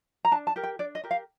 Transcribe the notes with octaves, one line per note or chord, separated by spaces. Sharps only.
A#5
D4 A5
A5
G4 A#4
G5
D4 D5
D#5
G4 A#4
F5